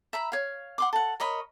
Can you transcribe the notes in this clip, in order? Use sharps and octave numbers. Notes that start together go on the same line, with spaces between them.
E5 A#5 B5
C#5 F5
F#5 C6 D6
A4 F#5
A#4 C#5 D#5 B5